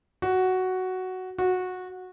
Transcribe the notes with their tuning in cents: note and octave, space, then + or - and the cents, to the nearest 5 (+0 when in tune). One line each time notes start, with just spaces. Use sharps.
F#4 +5
F#4 -15